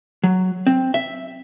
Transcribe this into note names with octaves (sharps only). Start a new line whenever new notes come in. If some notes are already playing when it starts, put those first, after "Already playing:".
F#3
C4
E5